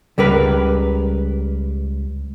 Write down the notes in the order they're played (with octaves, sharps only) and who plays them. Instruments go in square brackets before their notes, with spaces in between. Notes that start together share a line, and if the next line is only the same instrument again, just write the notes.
[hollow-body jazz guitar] C#2 G3 A#4 B4